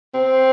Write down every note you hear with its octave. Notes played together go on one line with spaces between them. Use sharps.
C4